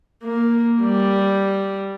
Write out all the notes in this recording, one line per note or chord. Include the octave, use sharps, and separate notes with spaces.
A#3
G3